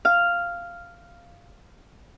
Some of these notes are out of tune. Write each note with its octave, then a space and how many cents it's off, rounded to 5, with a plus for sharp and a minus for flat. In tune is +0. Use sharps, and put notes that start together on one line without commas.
F5 -5